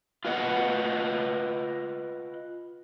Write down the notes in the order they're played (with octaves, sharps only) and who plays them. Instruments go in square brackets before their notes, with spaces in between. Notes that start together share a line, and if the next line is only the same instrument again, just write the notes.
[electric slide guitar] F4 B4 D#5 F#5